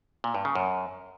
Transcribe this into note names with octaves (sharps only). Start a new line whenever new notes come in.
A#2
G2
C#3
F#2